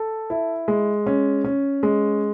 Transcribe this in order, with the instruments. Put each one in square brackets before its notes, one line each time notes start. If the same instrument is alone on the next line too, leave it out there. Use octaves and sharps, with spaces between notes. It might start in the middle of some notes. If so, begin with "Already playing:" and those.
Already playing: [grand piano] A4
E4
G#3
C#4
C#4
G#3